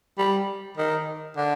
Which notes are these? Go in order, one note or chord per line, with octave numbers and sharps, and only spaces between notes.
G3
D#3
D3